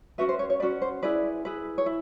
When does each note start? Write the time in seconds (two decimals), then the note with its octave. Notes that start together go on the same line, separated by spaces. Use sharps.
0.18 C#4 F#4 B4 E5
0.29 C5
0.39 C#5
0.50 C#5
0.60 C#4 F#4 B4 D5
0.82 C5
1.03 E4 G#4 B4 D5
1.45 E4 G#4 B4
1.78 C#5
1.86 E4